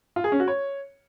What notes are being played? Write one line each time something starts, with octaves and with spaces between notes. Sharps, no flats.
F4
G#4
C#4
F#4
C#5